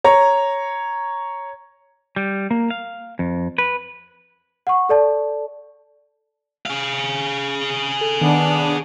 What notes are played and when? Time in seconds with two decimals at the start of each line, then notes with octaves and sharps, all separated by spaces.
0.04 C#5 A#5
2.16 G3
2.51 A#3
2.70 F5
3.19 F2
3.58 B4
4.67 F#5 C#6
4.89 A4 D5 A5
6.66 G#4 F5
8.01 A4
8.21 D#3 B3 D4